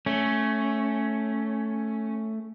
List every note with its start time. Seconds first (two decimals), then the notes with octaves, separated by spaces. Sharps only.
0.06 A3 C#4